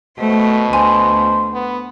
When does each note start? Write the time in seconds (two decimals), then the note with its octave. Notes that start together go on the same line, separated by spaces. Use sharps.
0.19 B2 A3 C5
0.73 D2 C5 G#5
1.54 B3